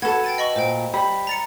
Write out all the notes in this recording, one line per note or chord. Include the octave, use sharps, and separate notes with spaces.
F#4 A4 B4 G#6 E7
G5 A6 D#7
D#5 B5 C#6
A#2 C5 G5
G3 B5
A#5 A6 C#7